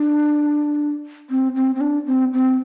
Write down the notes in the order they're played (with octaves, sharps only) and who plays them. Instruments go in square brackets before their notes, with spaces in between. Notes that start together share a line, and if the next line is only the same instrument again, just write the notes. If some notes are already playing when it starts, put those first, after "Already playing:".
Already playing: [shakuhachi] D4
C4
C4
C4
D4
C4
C4